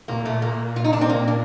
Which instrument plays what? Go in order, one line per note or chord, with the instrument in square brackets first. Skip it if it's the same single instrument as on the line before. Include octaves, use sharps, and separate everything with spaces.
[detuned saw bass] A#2 [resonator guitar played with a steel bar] A#3
[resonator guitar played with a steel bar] A3
A#3
F4
D#4
D4
C4
A#3
D4